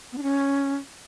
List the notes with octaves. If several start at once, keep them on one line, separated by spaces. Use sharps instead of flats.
B3
D4
C#4